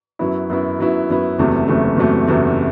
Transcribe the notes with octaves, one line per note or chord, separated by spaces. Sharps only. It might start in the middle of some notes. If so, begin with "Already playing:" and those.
F#2 F#3 B3 E4
F#2 F#3 B3 E4
F#2 F#3 B3 E4
F#2 F#3 B3 E4
F#1 E2 C3 F#3 A3
F#1 E2 C3 F#3 A3
F#1 E2 C3 F#3 A3
F#1 E2 C3 F#3 A3